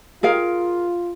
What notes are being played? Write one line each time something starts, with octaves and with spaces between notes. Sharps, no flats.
F4 G#4 A#4 F5